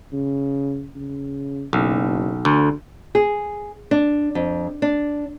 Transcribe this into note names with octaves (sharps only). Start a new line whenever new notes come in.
C#3
C#3
F#1 B1
D2 D3
G#4
D4
F2
D4